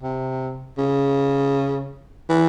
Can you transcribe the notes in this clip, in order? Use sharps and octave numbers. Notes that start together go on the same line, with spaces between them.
C3
C#3
E3